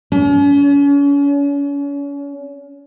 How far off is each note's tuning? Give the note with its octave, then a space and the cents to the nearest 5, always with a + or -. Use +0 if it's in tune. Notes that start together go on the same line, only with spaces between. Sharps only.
C#4 +40